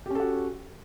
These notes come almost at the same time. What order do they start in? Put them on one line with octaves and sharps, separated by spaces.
G4 C#4 A4 F#4